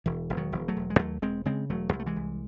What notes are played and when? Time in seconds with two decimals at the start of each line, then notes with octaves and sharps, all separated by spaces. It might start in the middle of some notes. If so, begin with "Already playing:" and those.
0.06 E1 E3
0.30 E1
0.37 D#3 F#3
0.52 E1
0.68 F#3 A3
0.76 E1
0.90 G#3
0.99 D#2 F#3 A3
1.22 E1 G#3 C4
1.45 C#3 G#3 C4
1.70 E1 F#3 A3
1.93 C2 G#3
2.00 A3
2.06 E3 G#3
2.16 C2